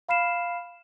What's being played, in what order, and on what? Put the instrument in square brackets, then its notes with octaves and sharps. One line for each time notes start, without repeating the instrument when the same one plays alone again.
[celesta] F5 B5 F6 C7 E7